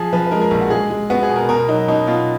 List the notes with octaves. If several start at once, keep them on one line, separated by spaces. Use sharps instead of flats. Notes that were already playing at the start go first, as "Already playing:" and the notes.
Already playing: F3 G#4
F3 B4
B4
G#3 A#4
A#4
A#1
F#4
G#3 G#4
G#3
B3 F#4
G#4
B2
A#4
B2 A#4
F#3 D#4
B2 D#4
B2 F4